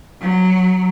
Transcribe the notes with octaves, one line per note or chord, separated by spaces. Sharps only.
F#3